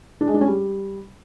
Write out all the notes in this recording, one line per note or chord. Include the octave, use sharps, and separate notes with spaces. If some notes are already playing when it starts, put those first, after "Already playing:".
D4
G#3
D4
C#4
G3